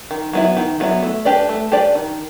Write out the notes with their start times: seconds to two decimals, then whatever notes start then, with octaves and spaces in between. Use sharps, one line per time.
0.11 D#3
0.33 F#3 B3 E4
0.57 D#3
0.80 F#3 B3 E4
1.03 A3
1.25 D4 G4 B4 D5
1.49 A3
1.72 D4 G4 B4 D5
1.95 D#3